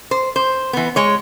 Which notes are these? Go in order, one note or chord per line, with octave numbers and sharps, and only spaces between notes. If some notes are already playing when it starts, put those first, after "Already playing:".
C5
C5
E3 B3
G#3 C#5